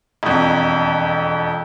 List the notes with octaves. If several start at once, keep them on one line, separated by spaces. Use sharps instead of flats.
E1 F2